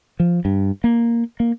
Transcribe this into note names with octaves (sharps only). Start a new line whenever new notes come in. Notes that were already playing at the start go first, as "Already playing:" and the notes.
F3
G2
A#3
A#3